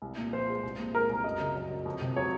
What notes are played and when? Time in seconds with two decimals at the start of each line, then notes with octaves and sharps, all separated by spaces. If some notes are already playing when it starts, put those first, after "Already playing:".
0.02 C2
0.17 A#2
0.33 F3 C5
0.49 G#3
0.63 C2
0.78 A#2
0.94 G#3 A#4
1.09 C2
1.24 F#2 D#5
1.39 C#3
1.55 F#3
1.71 F#2
1.85 F2
2.01 C3
2.16 F#3 C#5